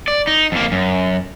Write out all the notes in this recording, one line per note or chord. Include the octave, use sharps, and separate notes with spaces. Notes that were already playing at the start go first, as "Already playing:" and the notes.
D5
D#4
F2 A#3
F#2